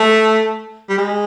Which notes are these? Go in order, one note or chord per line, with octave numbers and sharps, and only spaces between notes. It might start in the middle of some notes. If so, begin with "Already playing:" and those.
Already playing: A3
G3
G#3